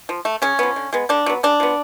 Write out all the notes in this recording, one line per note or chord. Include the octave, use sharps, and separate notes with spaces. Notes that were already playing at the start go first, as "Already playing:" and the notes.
F3
A3
C#3 C#4
F3 B3
D3
G#3 B3
D3 D4
F#3 B3
C#3 D4
F3 B3